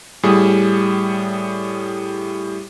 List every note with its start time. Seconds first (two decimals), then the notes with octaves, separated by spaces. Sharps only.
0.23 A2 G3 G#4 D#6